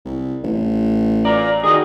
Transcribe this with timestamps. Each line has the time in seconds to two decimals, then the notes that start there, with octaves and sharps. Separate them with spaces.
0.05 C2
0.44 A1
1.25 F4 D5 A#5
1.64 D#3 F#4 G#4 D#5